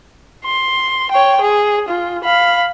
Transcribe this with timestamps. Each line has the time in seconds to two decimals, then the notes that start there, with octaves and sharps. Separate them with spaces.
0.45 C6
1.11 C#5 G5
1.41 G#4
1.89 F4
2.24 F5 B5